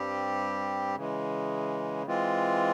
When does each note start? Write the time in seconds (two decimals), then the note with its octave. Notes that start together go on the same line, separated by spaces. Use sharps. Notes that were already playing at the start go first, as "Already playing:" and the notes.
Already playing: G2 G3 C4 G4
0.95 C#3 E3 G#3
2.07 E3 G#3 C4 F4